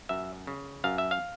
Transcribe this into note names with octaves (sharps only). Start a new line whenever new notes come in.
F#2 E5
C#3
F#2 F5
E5
F5